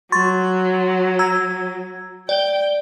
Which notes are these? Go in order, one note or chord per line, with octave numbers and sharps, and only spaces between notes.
F#3 C6 C#6 A6
A#5 E6 G#6
D5 G5 G7